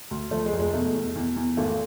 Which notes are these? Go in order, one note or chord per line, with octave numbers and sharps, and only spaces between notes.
D2
F3 A3
G#3
F1
G#3
B2 A3
E2
E2
E2
G#1 A3